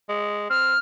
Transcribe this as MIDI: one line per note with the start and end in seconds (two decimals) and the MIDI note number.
0.09 0.48 56
0.50 0.74 60
0.50 0.79 89